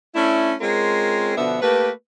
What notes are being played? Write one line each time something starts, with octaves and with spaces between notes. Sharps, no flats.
A3 C#4 D4 E4
G#3 C4 C#4 F4 A#4
B2 D3 F3 B3 D4 E5
A3 A#3 G4 B4